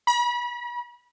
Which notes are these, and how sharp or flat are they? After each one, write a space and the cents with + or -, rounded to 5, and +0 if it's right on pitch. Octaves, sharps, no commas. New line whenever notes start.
B5 -35